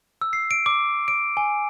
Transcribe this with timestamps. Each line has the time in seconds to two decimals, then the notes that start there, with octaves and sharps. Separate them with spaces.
0.21 E6
0.33 C7
0.51 D7
0.66 D6
1.08 D7
1.37 G#5